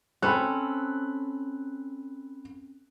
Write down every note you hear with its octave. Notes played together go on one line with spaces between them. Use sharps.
C4 C#4 A4 B5 F#6